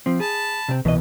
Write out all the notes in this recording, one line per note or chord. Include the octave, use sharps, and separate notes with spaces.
F3 C4
G#4 A5 B5
C3 C4
C2 B2 E3 B3 D#5